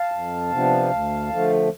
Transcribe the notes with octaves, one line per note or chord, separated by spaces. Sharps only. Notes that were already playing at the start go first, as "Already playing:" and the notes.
Already playing: F5 A5
F2
C3 F3 B3 D4
D2
D3 F3 A3